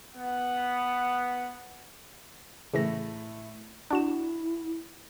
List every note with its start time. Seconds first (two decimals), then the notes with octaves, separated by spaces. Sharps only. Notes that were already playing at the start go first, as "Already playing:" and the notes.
0.16 B3 F#5
2.74 A2 C#3 E3 A3 E4 A#6
3.91 D4 E4 F#4 F#5 E7